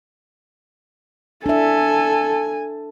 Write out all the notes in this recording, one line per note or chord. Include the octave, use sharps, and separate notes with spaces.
D4 A4 E5 G#5